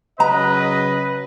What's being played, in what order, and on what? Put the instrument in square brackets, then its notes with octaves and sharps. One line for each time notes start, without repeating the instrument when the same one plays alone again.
[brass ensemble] C#3 F#3 D#5 [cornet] B4 [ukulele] A#5